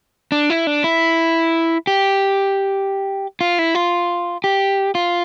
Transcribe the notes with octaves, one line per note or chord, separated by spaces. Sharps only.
D4
E4
D4
E4
G4
F4
E4
F4
G4
F4